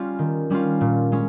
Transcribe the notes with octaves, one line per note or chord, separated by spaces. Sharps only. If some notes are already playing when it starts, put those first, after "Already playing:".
Already playing: G3 C#4 F4
D#3
G3 C#4 F4
A#2
G#3 C#4